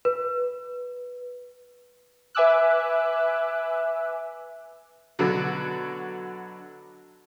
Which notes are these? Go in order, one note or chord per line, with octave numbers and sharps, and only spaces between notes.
B4
B4 E5 G#5 D6 E6 F#6
B2 D3 F#3